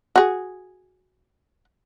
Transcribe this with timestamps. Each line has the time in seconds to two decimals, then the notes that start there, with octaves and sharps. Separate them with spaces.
0.16 F#4 G#4